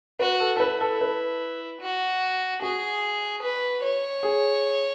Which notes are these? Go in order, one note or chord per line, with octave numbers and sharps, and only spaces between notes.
F#4 B4
A4
A4
E4 B4
A4
B4
F#4
F#4 G#4
B4
C#5
G#4